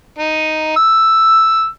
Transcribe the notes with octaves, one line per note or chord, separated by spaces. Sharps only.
D#4
E6